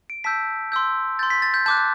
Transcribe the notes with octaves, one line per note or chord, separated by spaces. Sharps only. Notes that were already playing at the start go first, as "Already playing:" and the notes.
D7
A5 E6 G6 B6
C6 E6 G6
C6 G6 A6
B6
A6
G6
A5 D6 F#6 G6